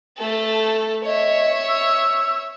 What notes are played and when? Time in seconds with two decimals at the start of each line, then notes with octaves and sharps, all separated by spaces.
0.18 A3 A4
1.06 C#5 D#5 E5
1.69 E6